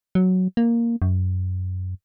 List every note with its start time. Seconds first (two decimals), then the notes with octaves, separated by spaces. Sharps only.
0.15 F#3
0.57 A#3
1.02 F#2